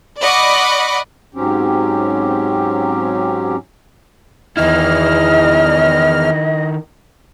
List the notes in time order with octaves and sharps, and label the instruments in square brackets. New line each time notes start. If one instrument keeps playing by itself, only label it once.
[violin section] D5 D#5 F#5 B5 C#6 D6
[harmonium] G#2 F#3 C4 C#4 G4
[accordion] E2 F6 [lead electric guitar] D#3 E4 [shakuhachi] D#5